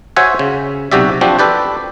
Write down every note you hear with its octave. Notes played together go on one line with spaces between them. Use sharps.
F#4 C5 C#5 E5 F#5 G#5
C#3
B1 C3 F#4 G4 D5 E5
F3 C4 D4 F#4 G4
A4 B4 D5 G5